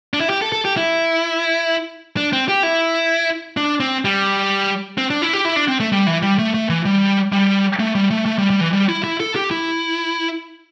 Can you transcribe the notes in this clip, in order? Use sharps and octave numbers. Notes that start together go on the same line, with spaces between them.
D4
E4
G4
A4
A4
G4
E4
D4
C4
G4
E4
D4
C4
G3
C4
D4
E4
G4
E4
D4
C4
A3
G3
E3
G3
A3
A3
E3
G3
G3
A3
G3
A3
A3
G3
G3
E3
G3
E4
E4
A4
G4
E4